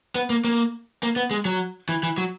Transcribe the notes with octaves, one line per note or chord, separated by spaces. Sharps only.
B3
A#3
A#3
A#3
B3
G#3
F#3
E3
E3
F#3